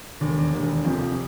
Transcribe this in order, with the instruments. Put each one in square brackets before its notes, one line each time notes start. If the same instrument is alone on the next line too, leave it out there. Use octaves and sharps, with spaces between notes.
[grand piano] E1 D#2 D3
E1 D#2 D3
F1 F2 C3 F3